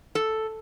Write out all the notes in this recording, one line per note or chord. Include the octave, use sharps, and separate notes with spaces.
A4